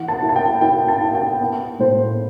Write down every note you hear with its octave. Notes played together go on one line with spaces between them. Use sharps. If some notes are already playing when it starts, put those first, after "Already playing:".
Already playing: E3 F#5
A5
E4
A5
G5
E4 G5
A5
E4
G5
B3
A2 C5